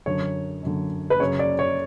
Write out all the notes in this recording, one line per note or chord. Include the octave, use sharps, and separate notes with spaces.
F#2 D3 C#5
F#2 D3
B4
F#2 C#3 C#5
D5
C#5